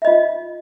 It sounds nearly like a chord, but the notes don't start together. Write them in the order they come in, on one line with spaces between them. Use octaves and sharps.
E5 D#5 F4